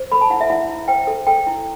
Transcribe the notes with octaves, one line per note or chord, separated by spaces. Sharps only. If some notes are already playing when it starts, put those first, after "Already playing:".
Already playing: C5
A4 B5
A5
E4 F#5
E5
E4 F#5
E4
C5 G5
A4
A4 G5
E4